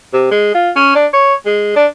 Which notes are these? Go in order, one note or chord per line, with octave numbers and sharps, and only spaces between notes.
C3
G#3
F4
C#4
D4
C#5
G#3
D4